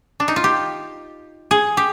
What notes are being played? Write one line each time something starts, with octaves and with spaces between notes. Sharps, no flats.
D4
D#4
F4
G4
G#4
G4